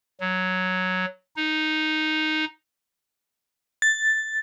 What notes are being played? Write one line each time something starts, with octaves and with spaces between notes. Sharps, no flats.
F#3
D#4
A6